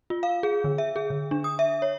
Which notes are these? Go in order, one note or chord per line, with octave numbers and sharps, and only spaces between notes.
F4
F5
G#4
D3
E5
G#4
D3
D4
D#6
E5
C#5